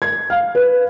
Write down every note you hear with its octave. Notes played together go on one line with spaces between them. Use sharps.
G#6
F5
B4